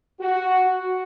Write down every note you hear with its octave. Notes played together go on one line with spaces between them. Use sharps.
F#4